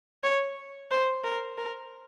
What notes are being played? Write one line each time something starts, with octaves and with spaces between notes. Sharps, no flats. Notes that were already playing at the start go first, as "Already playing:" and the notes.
C#5
C5
A#4
A#4